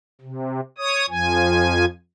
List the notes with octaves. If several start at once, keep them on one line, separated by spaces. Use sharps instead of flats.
C3
C#5 D#6
F2 F3 G#5